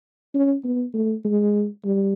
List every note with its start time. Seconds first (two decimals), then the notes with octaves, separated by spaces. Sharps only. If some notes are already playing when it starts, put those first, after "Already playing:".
0.35 C#4
0.64 B3
0.94 A3
1.25 G#3
1.85 G3